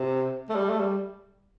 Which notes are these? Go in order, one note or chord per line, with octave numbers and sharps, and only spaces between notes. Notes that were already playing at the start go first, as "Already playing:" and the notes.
Already playing: C3
A3
G3
A3
G3